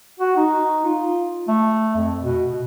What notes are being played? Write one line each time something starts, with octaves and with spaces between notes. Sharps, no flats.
F#4
D#4
F4
A3
F2
B2
B2